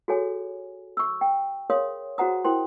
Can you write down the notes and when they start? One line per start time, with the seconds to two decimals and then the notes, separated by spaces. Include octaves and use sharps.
0.08 F#4 G#4 A4 C#5 G#5
0.97 C#6 E6
1.21 G5
1.70 G#4 A#4 C#5 F5 C6 D#6
2.18 F#4 G#4 C5 F#5 A#5 D#6
2.45 E4 A#4 C5 G5 C6